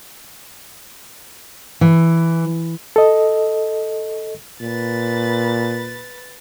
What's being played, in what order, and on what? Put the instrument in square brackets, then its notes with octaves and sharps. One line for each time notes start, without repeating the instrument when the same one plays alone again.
[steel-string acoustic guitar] E3
[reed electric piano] A4 D#5
[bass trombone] A#2 [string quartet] B4 A6